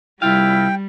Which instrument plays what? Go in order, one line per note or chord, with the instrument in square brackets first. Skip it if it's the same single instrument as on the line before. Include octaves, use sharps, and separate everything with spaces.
[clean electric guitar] C2 F4 F5 [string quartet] G3 [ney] E4 [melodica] G5